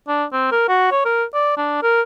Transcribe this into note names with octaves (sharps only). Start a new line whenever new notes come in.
D4
C4
A#4
F#4
C#5
A#4
D5
D4
A#4